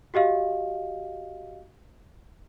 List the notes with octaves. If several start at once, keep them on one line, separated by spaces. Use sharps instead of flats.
F#4 G4 D#5 F5